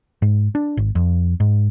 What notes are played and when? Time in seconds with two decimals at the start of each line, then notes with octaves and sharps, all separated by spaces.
0.22 G#2
0.55 D4
0.77 G#1
0.95 F2
1.40 G#2